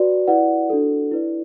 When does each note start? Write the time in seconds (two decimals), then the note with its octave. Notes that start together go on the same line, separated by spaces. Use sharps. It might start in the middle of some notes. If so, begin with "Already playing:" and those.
Already playing: F#4 B4 D5
0.27 E4 B4 D5 F#5
0.70 D4 F#4 A4
1.11 E4 B4 D5